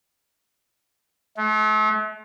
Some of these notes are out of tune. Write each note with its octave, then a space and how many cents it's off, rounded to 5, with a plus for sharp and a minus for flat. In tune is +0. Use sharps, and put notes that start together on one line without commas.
A3 -40